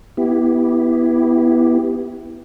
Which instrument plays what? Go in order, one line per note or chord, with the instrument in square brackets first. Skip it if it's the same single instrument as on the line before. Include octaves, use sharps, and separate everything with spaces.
[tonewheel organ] B3 E4 G4